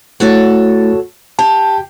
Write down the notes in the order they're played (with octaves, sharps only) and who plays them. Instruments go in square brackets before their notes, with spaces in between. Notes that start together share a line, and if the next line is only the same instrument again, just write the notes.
[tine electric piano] A3 E4 [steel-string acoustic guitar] F#4 A4 C#5
[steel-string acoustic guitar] G4 [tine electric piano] A5